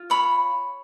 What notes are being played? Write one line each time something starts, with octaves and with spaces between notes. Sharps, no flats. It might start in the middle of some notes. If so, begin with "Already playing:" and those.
Already playing: F4
C#5 B5